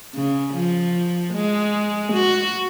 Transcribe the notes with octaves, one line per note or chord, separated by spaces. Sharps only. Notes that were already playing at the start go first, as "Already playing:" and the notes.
C#3
F3
G#3
F#4